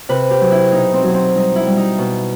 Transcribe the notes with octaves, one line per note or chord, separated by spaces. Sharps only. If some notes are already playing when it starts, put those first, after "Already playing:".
C3 B4
G4
F#3
E4
B2 D#4
C4
F#3
C4
G3 D#4
E4
G3
D#4
B2